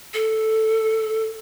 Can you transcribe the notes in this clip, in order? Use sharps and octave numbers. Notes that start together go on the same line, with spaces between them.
A4